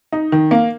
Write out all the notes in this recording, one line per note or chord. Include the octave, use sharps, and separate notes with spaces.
D#4
D#3
A#3